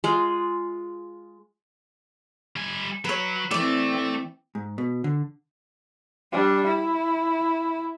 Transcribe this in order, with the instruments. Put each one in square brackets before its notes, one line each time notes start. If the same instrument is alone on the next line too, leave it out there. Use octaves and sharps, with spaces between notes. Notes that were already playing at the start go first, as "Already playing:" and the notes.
[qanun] G#3 F4
[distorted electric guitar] G3 G#5
[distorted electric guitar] F#3 [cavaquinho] B4 C#5
[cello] E3 C4 [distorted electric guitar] A3 [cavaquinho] D5 D6
[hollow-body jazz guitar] G#2
B2
D3
[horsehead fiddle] G3 D4
E4